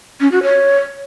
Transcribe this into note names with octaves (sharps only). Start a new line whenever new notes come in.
C#4
F#4
C#5